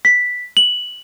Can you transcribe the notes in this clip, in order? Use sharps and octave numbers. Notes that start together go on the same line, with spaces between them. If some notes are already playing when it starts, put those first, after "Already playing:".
B6
F#7